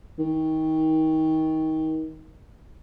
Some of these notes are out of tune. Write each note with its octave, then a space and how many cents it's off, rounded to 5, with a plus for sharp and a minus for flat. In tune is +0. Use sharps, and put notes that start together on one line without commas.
D#3 +25